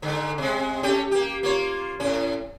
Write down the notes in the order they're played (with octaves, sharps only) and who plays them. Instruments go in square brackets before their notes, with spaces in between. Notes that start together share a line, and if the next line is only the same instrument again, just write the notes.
[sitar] G#2 D3
C3 G#3
A3 C#4 G4
A#3 G4
A#3 F4 C#5
A2 C#4